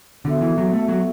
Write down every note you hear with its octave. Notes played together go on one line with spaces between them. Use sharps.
D3 B3 F#4 A4 E5
E3
F#3
A3
F#3